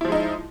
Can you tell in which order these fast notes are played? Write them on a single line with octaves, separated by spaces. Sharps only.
E4 F3 G#3 D#4